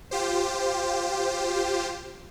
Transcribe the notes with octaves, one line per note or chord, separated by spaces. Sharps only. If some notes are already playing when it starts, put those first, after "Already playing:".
F4 G4 C5